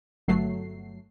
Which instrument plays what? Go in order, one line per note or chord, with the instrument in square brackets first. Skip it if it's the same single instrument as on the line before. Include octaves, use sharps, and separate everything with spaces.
[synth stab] G1 F#3 A3 C7